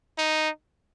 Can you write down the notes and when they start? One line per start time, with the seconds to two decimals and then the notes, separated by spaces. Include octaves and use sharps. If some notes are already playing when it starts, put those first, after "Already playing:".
0.18 D#4